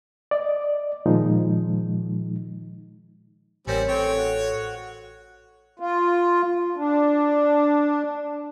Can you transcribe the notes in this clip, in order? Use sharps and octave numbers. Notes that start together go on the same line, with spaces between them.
D5 D#5
A#2 D#3 F3 G#3 D#4
A1 G3 C4 A#4 C#5 G#5
C4 A4 C#5 G5
F#4
F4
D4